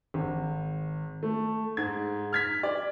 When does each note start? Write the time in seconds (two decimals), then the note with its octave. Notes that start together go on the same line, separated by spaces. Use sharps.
0.14 G#1
1.23 A3
1.77 G#2 G#6
2.33 F6 G#6 B6
2.63 D5